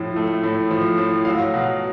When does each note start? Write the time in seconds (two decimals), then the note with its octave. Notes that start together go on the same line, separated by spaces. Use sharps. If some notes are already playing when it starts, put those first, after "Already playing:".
Already playing: A2 F3
0.16 A3
0.43 A2
0.71 F3
0.98 A2
1.25 F#3 F5
1.54 B2